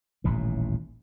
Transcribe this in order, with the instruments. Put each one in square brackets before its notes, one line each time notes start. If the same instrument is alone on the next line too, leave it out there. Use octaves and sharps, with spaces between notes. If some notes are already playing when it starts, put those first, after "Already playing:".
[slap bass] D#1 A1 D#2 A2